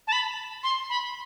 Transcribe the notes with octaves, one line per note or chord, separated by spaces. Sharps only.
A5
B5
C6
B5